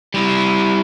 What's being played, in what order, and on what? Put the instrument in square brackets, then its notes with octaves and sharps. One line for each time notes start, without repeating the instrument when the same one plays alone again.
[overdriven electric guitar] G3 E4